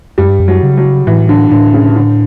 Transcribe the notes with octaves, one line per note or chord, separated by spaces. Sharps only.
F#2 G3
G2
F#2
F#3
C#3
F#3
A2 E3
D3
A2 D3
C#3
D3